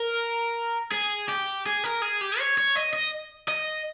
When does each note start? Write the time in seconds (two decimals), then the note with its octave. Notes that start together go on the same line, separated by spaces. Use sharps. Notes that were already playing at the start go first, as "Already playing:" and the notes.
Already playing: A#4
0.92 G#4
1.29 G4
1.66 G#4
1.84 A#4
2.02 G#4
2.21 G4
2.39 C#5
2.58 C#5
2.76 D#5
2.93 D#5
3.48 D#5